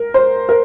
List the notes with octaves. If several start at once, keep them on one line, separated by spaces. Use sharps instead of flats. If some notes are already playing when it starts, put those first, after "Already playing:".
Already playing: A#4
C5
A#4